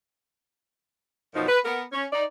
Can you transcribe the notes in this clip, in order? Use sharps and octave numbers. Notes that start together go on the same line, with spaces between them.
F#2 B2 F3 D#4
B4
B3 A#4
C#4
D#4 D5